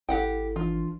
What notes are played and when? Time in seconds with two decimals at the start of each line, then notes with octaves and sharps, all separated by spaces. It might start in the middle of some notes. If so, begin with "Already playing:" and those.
0.09 G#1 E4 G4 A4 F#5 G5
0.56 E3 D4 F4